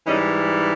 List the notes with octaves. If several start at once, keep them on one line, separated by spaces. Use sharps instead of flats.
G#2 E3 G3 C#4 D#4